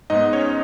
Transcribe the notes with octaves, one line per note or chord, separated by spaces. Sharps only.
G#2 G#3 B3 D#4 D#5
C#4 C#5